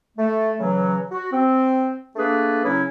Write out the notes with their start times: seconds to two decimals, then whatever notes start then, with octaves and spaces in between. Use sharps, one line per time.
0.18 A3
0.60 C#3 E3 F#3
1.12 F#4
1.32 C4
2.16 A3 A#3 D4 G#4 B4
2.65 C#3 F#3 C#4 E4